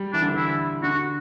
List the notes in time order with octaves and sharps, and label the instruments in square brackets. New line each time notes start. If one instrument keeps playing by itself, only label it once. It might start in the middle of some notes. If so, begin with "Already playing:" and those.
Already playing: [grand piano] G3
[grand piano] E3 [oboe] D4
[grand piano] D3
[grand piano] E3 [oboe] E4
[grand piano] D3 [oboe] F#4